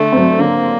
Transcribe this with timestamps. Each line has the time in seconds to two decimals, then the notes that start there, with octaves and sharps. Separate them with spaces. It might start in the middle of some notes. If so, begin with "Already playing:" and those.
Already playing: D3 A3
0.12 F#3 C4
0.39 D3 A#3